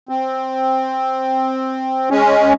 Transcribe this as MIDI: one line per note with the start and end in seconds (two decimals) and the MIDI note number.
0.09 2.09 60
2.10 2.53 56
2.10 2.53 61